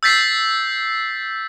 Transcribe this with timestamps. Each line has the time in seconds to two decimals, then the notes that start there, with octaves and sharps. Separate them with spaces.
0.03 E6 G6 A6 B6 C7